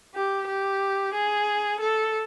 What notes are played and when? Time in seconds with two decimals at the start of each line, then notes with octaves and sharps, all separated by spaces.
0.15 G4
0.48 G4
1.14 G#4
1.81 A4